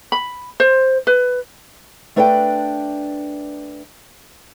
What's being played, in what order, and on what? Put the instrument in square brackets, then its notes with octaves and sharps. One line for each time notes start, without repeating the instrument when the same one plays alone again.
[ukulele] B5
C5
B4
[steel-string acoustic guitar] A3 D4 B4 D5 E5 G5